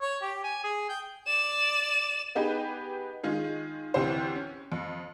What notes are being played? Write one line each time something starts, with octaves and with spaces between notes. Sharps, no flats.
C#5
G4
G#5
G#4
G5
D5 E7
B3 D#4 G4 G#4 B4
D#3 G#3 F4 G#4
D2 C3 E3 G4 C5
C#4
F2